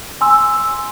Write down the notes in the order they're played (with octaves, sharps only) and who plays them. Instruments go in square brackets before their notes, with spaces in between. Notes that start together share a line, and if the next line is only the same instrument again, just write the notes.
[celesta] G#5 C6 E6